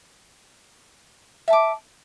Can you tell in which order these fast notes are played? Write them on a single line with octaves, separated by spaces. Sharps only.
E5 A5 D6